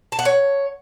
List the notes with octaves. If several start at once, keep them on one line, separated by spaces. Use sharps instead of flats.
A5
F#5
C#5